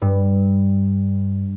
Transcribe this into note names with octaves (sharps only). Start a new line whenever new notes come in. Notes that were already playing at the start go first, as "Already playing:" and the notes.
G2